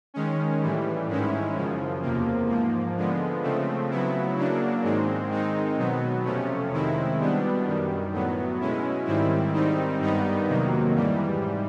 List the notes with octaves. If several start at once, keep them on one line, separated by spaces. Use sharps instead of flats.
D#3 G#3 C#4
A2 E3 G3
G#2 D#3 G#3 C#4 E4
F#2 C#3 F3
E2 C3 F3 A#3
G#2 F3 A#3
D3 F3 G#3 B3
C#3 F3 A3 C4
C#3 F#3 B3 E4
C#3 F#3 A#3 D4
G#2 D#3 G#3 C4
D#3 G#3 C4 D#4
B2 F#3 B3
F2 C3 F3 A3 C#4
C3 D#3 G#3 C4 E4
B2 G3 B3 D4
F#2 D#3 G3
A2 F#3 B3
B2 G#3 C#4 E4
G#2 D#3 G3 C4 E4
G#2 D#3 G3 C4 D#4
G2 D#3 G3 B3 D#4
F2 C3 D#3 F#3 A#3
G#2 E3 G3